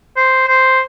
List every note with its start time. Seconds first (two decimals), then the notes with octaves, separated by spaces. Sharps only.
0.17 C5
0.48 C5